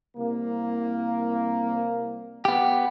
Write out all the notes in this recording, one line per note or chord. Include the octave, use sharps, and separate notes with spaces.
C2 A#3
B3 G4